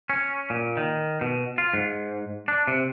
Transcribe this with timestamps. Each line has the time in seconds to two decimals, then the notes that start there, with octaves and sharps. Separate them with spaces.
0.10 C#4
0.50 A#2
0.77 D#3
1.21 B2
1.58 F4
1.74 G#2
2.48 D4
2.67 C3